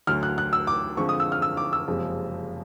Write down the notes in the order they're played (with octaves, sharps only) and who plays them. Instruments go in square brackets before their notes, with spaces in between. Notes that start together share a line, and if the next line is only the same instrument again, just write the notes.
[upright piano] D2 D3 F#3 F6
F#6
F#6
E6
D6
F2 D3 F3 G#3 C#6
D#6
E6
F6
E6
D6
E6
F#1 F2 C3 F3 G#3